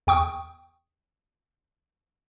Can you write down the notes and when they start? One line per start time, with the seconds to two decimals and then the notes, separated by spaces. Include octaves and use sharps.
0.07 E2 G5 C#6 D#6